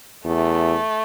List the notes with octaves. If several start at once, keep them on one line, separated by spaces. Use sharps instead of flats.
E2 A3